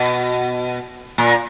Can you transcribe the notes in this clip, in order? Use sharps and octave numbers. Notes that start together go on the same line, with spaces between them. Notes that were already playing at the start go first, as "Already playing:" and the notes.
Already playing: B2
A#2